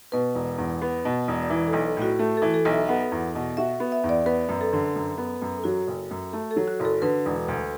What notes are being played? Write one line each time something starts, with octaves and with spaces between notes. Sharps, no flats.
B2 B4
E1
E2
B3
B2
E1
D5
E3 B4
A4
B1
A4
A2
F#4
A3 A4
E3 A4
A4
B1
E5
B3 F#5
E2
B2
F#4 E5
B3
E5
E2
D5
B3 B4
F#2
A4
D3
F#2
B3
F#2
A4
F#3 F#4
F#1
F#2
A3 A4
A4
F#3
F#4
F#1
A4
D3 B4
E1
D2